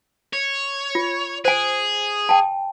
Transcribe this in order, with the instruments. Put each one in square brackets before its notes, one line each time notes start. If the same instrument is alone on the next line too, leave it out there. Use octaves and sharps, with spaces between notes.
[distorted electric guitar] C#5
[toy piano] F4
[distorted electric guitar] G#4 [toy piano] C5 G#5
[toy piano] G5 A5